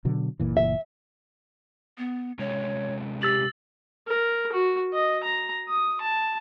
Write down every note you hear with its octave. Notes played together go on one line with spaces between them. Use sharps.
B2 D3 F#3
F#1 A#2 E3
E5
B3
C3 G#3 C#4 C#5
G4 E6 A6 F#7
A#4
F#4
D#5
A#5
D#6
A5